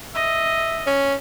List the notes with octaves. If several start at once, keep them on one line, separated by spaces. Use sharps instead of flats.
D#5 E5
C#4